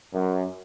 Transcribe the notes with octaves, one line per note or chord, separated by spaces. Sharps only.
F#2